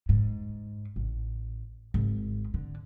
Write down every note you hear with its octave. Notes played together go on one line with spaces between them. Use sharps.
G#2
A1
G#1
D3